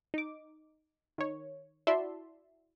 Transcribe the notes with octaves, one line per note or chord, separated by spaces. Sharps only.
D#4 D6
D#3 C#5
E4 F#4 D5 E5 A5 C6